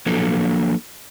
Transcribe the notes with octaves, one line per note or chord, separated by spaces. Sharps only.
F3 F#3 A#3 D4 A4